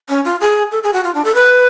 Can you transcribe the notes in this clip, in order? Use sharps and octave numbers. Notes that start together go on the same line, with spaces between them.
C#4
F4
G#4
A4
G#4
F#4
F4
D4
A4
B4